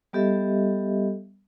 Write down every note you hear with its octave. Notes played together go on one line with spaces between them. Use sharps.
G3 B3 G4 A4 D#5 E5